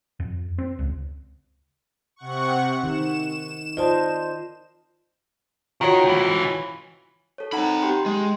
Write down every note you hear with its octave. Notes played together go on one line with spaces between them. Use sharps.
F2
C4
C#2
C3 F#5 C#6
D#3 E7
F4 C5 D5 D#5 A5
D#3 F4 F#4 C#5
C#2 E3
A4 C#5
C4 D#4 F#5 A#5 B5
G4 G5 C6
G#3